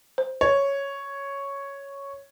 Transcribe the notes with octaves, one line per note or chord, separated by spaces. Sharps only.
C5
C#5